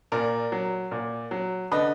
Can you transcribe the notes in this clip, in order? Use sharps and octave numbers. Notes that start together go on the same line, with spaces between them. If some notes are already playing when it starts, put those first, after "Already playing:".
A#2 A#4 D5
F#3
A#2
F#3
D3 B4 D#5